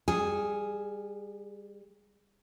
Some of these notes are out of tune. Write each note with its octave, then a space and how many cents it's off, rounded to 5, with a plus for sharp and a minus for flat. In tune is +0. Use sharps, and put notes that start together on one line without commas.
G3 +30 G#4 +0